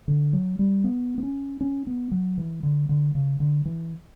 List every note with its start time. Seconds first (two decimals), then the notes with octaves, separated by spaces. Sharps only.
0.08 D3
0.33 F#3
0.59 G3
0.84 B3
1.18 B3
1.23 C#4
1.61 C#4
1.87 B3
2.11 F#3
2.38 E3
2.63 D3
2.89 D3
3.15 C#3
3.40 D3
3.65 E3